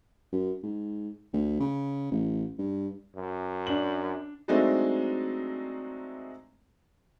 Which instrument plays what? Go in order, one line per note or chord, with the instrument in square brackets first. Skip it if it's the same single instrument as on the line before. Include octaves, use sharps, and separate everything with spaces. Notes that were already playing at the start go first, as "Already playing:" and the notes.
[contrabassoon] F#2
G#2
D2
C#3
A1
G2
[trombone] F#2
[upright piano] D4 F#7
[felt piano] F#3 G#3 A3 C4 D4 D#4